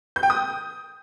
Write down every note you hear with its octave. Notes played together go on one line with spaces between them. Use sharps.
G6
G5
D#6